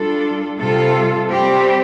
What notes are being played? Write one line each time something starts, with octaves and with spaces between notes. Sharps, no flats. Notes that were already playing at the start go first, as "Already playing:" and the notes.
Already playing: G3 D4 F4 A4
C3 G3 F4 A4
G3 C4 G4